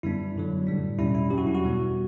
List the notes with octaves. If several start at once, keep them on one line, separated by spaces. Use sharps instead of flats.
F#2 D3 G3 B3 D4 E4
G2 D3 F#3
A2 G3 D4
E2 B2 G3 C#4 E4
E4
G2 F#3 C#4 G4
F#4
E4
F#4
E2 B2 G3 B3